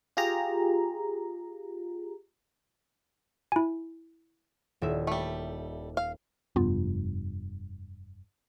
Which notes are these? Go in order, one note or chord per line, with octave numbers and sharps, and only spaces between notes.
F4 G4 G#4 A#5
E4 G#5
D#1 E4 E5
G3 A3
F5
F1 G2 B3 F4